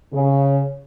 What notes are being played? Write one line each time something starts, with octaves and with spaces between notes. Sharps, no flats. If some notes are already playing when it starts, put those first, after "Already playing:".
C#3